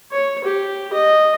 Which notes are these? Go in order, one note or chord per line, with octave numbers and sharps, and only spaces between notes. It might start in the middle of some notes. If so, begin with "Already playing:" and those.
C#5
G4
D#5